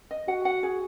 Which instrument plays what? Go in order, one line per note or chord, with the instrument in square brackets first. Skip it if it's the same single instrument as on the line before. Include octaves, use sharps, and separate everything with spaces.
[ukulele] D#5
[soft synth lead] F#4 [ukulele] F#5
[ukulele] F#5
G#4